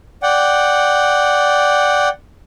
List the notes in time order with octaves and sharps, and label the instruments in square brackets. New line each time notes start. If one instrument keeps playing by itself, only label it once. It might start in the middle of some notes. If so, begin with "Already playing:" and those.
[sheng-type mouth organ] D5 F#5 G5